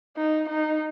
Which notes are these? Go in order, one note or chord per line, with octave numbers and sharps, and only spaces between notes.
D#4
D#4